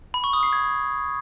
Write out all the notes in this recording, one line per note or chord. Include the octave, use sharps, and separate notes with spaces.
B5
C#6
D#6
C7
G#6